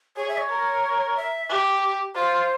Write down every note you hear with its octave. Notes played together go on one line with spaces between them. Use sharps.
G#4 C#5
E5
C#5
A#4
E5
G4
F4 C5